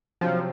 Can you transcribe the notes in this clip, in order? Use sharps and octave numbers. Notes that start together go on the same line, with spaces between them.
C3 F3 F#3 C4